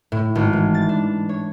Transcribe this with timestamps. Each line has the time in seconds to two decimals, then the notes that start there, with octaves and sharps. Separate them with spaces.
0.12 A2
0.35 G#1
0.53 E3
0.74 A6
0.89 D4
1.29 C#5